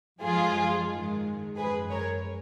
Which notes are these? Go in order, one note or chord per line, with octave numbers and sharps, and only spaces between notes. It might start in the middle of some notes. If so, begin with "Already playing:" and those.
F#2 F3 G#3 F4 G#4
G#2 D#3 G#3
F#2 F3 G#3 G#4 B4
A#4 C#5